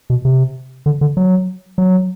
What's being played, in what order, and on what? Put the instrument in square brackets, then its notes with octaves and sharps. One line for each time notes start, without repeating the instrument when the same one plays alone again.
[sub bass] B2
C3
D3
D3
F#3
F#3